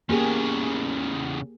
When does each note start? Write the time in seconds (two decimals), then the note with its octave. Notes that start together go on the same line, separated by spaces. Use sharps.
0.09 E2 C#3 A#3 G4 G#4